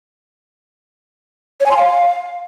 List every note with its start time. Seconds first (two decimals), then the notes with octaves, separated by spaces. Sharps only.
1.60 C#5
1.66 G#5
1.71 C6
1.77 F5